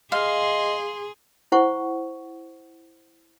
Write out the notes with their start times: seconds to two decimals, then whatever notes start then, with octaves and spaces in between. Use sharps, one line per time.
0.12 G#4 D#5 F5 C6
1.52 E4 C5 F#5 C#6